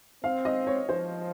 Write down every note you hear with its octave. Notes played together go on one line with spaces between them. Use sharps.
C4 F5
D#5
C#5
F3 C5